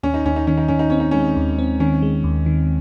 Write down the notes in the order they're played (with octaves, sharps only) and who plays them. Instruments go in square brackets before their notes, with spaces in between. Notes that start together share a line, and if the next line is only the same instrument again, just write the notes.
[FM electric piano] D#2 [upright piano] C#4
[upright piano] D#4
[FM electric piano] D#2 [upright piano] C#4
[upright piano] D#4
[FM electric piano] D#3 [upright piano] C#4
[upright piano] D#4
[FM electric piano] D#3 [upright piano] C#4
[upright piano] D#4
[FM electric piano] C4 [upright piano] C#4
[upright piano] D#4
[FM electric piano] G#3 [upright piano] C#4
[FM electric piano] D#2
C4
[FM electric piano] D#3 [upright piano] C#4
[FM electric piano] G#3
D#2
D#3